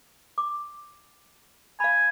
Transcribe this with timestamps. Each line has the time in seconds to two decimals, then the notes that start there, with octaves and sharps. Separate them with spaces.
0.38 D6
1.80 F5 G#5 B5